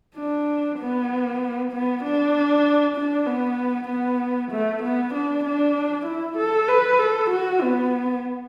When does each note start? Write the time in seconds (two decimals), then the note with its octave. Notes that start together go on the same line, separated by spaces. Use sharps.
0.17 D4
0.80 B3
1.72 B3
2.04 D4
2.97 D4
3.27 B3
3.89 B3
4.52 A3
4.83 B3
5.14 D4
5.45 D4
6.06 E4
6.38 A4
6.69 B4
6.99 A4
7.31 F#4
7.62 B3